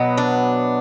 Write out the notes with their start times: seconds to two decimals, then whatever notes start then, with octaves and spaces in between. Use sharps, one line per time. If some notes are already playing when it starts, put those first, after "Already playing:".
Already playing: B2 F#3 B3
0.17 D4